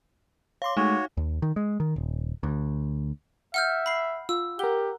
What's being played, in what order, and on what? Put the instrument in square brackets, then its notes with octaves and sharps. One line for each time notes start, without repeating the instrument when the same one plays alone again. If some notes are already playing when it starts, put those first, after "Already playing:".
[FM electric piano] C#5 C6 [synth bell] F5 D6
[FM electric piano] G#3 A3 [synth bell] D#4 [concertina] F#4 C#5
[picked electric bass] D#2
D#3
G#3
D#3
D#1
D2
[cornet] E5 [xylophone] F#5 F6 G6
[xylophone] B5 C7
[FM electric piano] F4 [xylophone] E6
[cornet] G4 [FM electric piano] A#4 F#5 [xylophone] G7